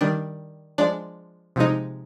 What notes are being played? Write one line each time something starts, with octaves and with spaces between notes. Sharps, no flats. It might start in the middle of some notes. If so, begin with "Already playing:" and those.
D#3 G3 D4
F3 G#3 D4
C3 F3 G#3 D#4